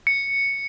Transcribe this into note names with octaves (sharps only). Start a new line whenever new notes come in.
C#7